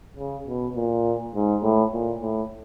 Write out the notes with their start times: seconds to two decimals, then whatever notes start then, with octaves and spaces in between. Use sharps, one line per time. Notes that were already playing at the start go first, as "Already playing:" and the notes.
0.17 C#3
0.47 B2
0.75 A#2
1.35 G#2
1.63 A2
1.93 A#2
2.22 A2